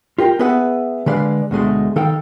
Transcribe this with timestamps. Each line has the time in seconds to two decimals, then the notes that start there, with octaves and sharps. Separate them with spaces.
0.18 F4 G4 A#4 G5
0.39 B3 G#4 B4 E5 F#5
1.06 D3 G#3 B4 D5 F5
1.51 D2 B2 G#3 A3
1.96 D#3 A4 F5 G5